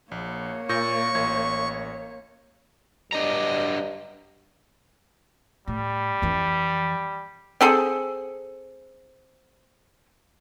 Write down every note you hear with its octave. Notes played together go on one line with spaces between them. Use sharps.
A#1 A#3 C#5
A#2 C#6 G6 A#6
A1 G#6
G2 F#3 D4 D#5 A#5
A2 G3
F2 E3
C4 G#4 A4